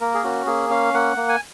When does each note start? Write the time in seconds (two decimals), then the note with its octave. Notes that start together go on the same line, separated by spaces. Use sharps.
0.01 A#3 A#4
0.14 G#4
0.24 C#4 F#4
0.46 A#3 G#4
0.70 C#4 F5
0.94 A#3 F#5
1.17 A#3
1.29 G#5